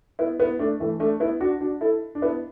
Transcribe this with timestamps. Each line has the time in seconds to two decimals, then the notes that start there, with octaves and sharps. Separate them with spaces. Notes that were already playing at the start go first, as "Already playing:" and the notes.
0.19 B3 E4
0.39 B3 E4
0.59 A3 D4
0.80 E3 A3
1.00 A3 D4
1.20 B3 E4
1.40 D4 F#4
1.61 D4 F#4
1.81 E4 A4
2.15 D4
2.22 B3 E4